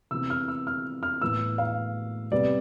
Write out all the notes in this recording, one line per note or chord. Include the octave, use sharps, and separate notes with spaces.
C3 E3 B3 E6
F6
E6
F6
F6
A2 E3 B3 E6
F5
C3 G3 B3 D5